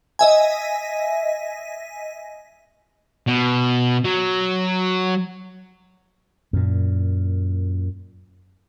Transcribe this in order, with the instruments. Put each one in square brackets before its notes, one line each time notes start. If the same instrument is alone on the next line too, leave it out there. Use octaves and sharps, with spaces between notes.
[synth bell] D#5 E5 G#5
[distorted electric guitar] B2
F#3
[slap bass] F#2 A#2